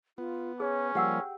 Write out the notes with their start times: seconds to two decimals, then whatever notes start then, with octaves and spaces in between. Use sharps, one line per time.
0.18 B3 F4
0.60 C#4 G#4 C#5
0.95 F3 G3 A#3 G4 F#5 G5 E6